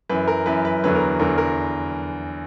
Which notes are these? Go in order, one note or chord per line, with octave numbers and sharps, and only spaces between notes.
F#2 E3 B4
A#4
F#2 E3 B4
B4
E2 D3 F#3 B4
A#4
E2 D3 F#3 A#4
A#4